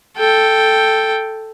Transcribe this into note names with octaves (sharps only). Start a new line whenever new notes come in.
A4 G5